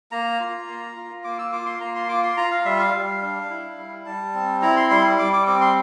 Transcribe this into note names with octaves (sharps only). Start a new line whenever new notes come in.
A#3 A#5
F4
A#3
F4
A#3 D6
E6
F4 D6
C6
A#3 A#5
C6
F4 D6
C6
F4 A#5
F5
G3 E5
F5
G3
D4
E4
G3
G3 A5
C4
E4 A#5
C6
G3 C6
G3 D6
D6
C4 D6
C6